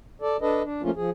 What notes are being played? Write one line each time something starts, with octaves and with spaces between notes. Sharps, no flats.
A4 D5
D4 A4 B4 D#5
D4
F3 A3 A#3 C#4 F4
F3 G#4